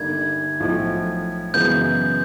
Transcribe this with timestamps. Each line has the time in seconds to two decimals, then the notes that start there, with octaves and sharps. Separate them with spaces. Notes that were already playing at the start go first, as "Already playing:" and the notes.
Already playing: G1 G2 D#3 G3 A#3 G#6
0.60 B1 A2 F3
1.54 F#2 C#3 E3 G#3 B3 G6